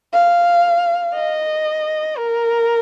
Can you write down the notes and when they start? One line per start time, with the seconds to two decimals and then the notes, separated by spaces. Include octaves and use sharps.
0.13 F5
1.14 D#5
2.18 A#4